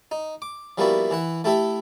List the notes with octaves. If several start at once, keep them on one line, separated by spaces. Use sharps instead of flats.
D#4
D6
F3 G3 A#3 B3 E4 F#4
E3 E4 F#5
A3 E4 G4 A4 E5